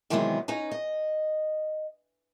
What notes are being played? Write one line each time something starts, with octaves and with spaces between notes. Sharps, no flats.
C3 D#3 E3 F#3 G#3 B3
C#4 D#4 B4 A#5
D#5